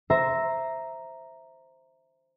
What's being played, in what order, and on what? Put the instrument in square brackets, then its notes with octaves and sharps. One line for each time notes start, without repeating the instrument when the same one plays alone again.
[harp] C5 E5 A#5